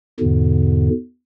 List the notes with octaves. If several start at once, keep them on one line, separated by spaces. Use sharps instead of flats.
E2 G#2 B2 D3